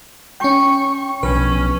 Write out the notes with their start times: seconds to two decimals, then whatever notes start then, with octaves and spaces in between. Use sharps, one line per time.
0.40 C#4 G5 C#6
1.23 B1 F3 C#4 B4